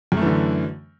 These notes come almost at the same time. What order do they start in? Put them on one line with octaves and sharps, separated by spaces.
F#2 A3 E3 D3